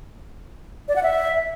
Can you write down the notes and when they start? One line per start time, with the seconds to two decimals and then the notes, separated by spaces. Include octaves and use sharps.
0.88 D5
0.96 F#5
1.03 E5